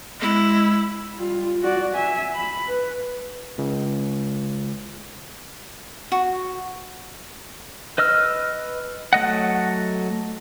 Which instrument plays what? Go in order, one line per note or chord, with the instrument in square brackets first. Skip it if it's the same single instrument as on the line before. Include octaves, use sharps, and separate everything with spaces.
[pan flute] G#3 [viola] E4
[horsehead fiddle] G3 F4
F#4 D5
E5 G#5
B5
B4
[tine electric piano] C#2
[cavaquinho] F#4
[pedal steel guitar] B4 D#5 E6 F6
F#3 A3 D#5 F#5